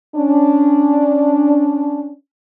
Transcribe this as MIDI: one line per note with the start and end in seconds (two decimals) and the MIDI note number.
0.16 2.12 61
0.16 2.12 62